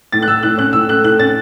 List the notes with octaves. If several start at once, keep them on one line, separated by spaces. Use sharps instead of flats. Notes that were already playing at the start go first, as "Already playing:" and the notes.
A2 A6
F#6
A3 E6
A2 F#6
C#4 F#6
A2 E6
A3 F#6
A2 F#6
C#4 A6